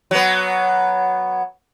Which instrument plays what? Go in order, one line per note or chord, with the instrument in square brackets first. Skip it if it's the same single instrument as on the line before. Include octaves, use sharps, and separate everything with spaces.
[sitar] F#3 B3